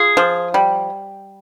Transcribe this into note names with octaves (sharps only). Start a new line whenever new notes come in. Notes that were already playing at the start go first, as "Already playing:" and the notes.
Already playing: F4 G#4
F3
G3